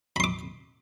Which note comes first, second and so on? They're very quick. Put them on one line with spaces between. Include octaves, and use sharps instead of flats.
B5 C6 D6